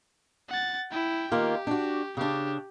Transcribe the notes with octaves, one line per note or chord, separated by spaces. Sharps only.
F#5 A6
E4 G5
D#3 A#3 F4 G4
D4 F#4
C#3 D4 G4